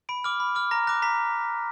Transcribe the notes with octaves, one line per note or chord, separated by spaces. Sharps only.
B5 D7
D6 F6
B5
D6 F6
A#5 A#6
D6 F#6 A#6
A#5 B6